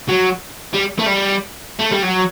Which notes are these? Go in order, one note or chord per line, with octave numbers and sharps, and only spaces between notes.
F#3
G3
A3
G3
A3
G3
F#3